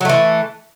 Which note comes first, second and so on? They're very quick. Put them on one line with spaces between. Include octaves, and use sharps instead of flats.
F#3 A3 E3